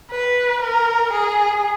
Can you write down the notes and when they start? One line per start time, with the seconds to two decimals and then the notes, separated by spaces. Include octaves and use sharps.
0.11 B4
0.62 A#4
1.13 G#4